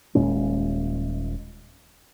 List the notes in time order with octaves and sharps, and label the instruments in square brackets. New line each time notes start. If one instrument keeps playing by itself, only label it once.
[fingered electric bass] D#1 A#2 G#3 C#4